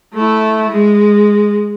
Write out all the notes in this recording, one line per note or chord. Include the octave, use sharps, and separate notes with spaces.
A3 E4
G#3